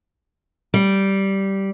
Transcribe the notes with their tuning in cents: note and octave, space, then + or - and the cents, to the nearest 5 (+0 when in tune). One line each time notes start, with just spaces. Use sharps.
G3 -10